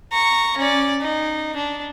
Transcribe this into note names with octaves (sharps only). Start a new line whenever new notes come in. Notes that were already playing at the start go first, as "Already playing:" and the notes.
A#5 C#6
C#4 D5
D#4
D4